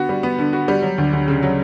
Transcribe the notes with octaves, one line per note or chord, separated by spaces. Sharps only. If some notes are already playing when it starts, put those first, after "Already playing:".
Already playing: D3 B3 F#4
G3
B3
D3
F#4
G3
F#3
D2
D2
C#3
F#3